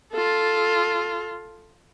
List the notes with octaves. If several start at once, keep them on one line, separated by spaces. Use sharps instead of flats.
F4 A4